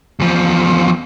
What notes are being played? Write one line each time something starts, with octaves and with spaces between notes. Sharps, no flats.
E2 F3